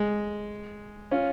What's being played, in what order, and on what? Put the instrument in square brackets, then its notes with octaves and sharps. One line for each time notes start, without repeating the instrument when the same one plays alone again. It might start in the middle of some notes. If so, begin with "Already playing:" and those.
Already playing: [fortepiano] G#3
C#4 F4